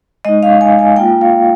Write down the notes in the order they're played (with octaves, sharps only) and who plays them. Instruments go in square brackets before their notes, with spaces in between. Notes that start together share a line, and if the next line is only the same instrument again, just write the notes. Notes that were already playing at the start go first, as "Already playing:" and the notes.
[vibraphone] G#3 D#4 D#5
F5
G#5
G#5
A#3 F4 G5
F5